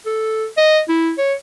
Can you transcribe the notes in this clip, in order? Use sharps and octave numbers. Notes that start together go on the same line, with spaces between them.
A4
D#5
E4
C#5